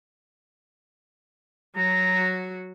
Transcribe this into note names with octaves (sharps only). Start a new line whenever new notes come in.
F#3 F#4 A#5